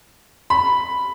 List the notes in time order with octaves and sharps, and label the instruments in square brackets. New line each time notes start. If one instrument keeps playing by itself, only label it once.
[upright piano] B5